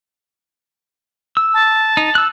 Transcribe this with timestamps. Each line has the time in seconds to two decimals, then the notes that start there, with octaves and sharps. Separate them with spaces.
1.37 E6
1.54 A5
1.97 D#4
2.15 E6 F#6